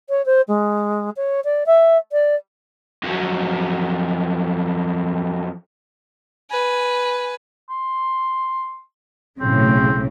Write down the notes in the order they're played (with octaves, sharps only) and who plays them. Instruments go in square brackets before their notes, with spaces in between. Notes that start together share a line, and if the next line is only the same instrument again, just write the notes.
[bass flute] C#5
C5
G#3
C#5
D5
E5
D5
[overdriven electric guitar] F2 F#3
[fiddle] B4 G#5
[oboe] C6
[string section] B1 A2 C#3 [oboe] C4